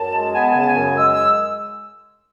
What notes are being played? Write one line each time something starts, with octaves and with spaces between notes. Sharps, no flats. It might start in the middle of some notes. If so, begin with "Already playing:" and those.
Already playing: F#2 A5
G#3
B3 G#5
A5
G#5
C#3 A5
G#5
F#2
G#3 E6
E6